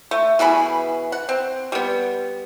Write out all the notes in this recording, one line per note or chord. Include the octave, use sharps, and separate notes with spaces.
A3
B2 E3 G#4 B5
F#5
C4
G3 B3